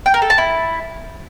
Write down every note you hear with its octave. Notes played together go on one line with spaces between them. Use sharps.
G5
A#4
A4
A5
E4